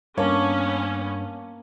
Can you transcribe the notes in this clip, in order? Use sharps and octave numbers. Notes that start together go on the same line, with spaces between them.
G2 A#3 B3 C#4 C#5 A5